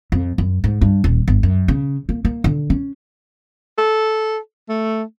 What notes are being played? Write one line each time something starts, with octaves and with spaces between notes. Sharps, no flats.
F2
F#2
G#2
G2
D#1
G1
F#2
C#3
A#3
A#3
D3
C#4
A4
A3